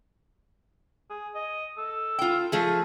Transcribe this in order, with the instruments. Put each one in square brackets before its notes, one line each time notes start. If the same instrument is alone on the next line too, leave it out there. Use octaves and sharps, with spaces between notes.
[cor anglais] G#4
D#5
A4
[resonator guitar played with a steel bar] F4 G5
F3 A3 G#4